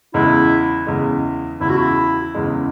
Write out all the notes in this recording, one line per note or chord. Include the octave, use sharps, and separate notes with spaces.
E2 C#3 G#3 E4
E2 C#3 G#3
E2 C#3 G#3 E4
F#4
E4
E2 C#3 G#3